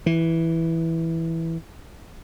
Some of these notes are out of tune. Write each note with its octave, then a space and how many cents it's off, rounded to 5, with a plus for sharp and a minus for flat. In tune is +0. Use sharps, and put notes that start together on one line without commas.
E3 -5